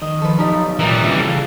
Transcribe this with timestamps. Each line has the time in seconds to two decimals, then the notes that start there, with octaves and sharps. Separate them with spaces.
0.02 D#3 D#5
0.22 F3 A4 B4
0.39 B1 F3 G3 A3 D#4
0.79 A#2 E3 G3 D#4 A#4 E5
1.01 D#2 C#3
1.20 C#3 F4 A4